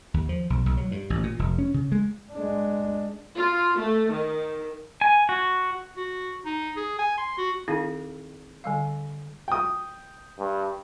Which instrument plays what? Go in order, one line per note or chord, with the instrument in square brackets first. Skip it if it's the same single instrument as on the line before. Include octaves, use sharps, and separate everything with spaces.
[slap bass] D#2
F3
B1
B1
F#3
G2
A1
A#2
F1
C#4
C#3
G#3
[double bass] G#3 D4
[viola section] F4
A3
D#3
[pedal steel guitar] G#5
F#4
[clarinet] F#4
D#4
G#4
G#5
C6
F#4
[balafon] D#3 C4 D#4 E4 G#4 F5
D3 G3 F5
[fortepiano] G5 D#6
[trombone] G2